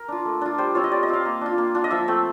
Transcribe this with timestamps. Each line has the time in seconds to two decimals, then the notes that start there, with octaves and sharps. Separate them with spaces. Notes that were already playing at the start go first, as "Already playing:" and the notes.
Already playing: A#4
0.08 D4 F4
0.25 A3
0.41 D4 F4
0.58 G3 C5
0.75 C4 F4 C#5
0.84 D#5
0.91 G3 D5
1.03 D#5
1.08 C4 F4 F5
1.25 A#3
1.41 D4 F4
1.58 A#3
1.75 D4 F4
1.84 D#5
1.91 F3 E5
2.08 A3 C4